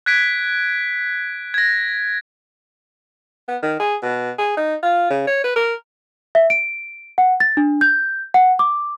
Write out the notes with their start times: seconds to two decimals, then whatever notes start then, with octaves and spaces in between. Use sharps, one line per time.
0.06 F#6 G#6 B6 D7
1.54 G#6 A#6
3.48 B3
3.62 D#3
3.80 G#4
4.02 B2
4.38 G#4
4.57 D#4
4.83 F4
5.10 C#3
5.27 C#5
5.44 B4
5.56 A#4
6.35 E5
6.50 D7
7.18 F#5
7.40 A6
7.57 D4
7.81 G6
8.34 F#5
8.59 D6